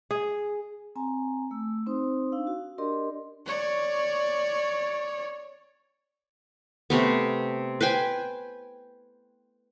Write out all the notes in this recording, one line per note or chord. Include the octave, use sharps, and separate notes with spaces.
G#4
C4 G#5 A#5
A3 E6
C4 D#4 C5 C6 D#6
D4 D#4 F5 E6
F#4
D4 G4 A#4 D5 D#5 C6
C#5 D5
C3 A3 B3
B4 C5 G5 G#5